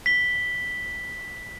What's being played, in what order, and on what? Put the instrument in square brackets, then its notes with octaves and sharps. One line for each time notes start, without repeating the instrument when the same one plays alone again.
[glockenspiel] B6 G7